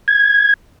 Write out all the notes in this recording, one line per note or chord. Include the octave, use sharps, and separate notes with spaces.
G#6